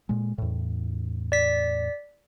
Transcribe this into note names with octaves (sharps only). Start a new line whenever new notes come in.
A#2 G#3
E2 A2
D5 B6